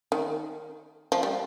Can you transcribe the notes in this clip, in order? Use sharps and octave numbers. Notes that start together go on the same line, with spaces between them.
D#3
F3
G3